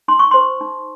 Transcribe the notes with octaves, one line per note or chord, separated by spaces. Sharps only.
D#4 C6
C#6
C5 C6
D#4